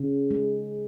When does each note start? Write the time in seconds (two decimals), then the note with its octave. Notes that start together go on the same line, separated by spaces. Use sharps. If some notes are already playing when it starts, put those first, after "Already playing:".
Already playing: C#3
0.31 G#3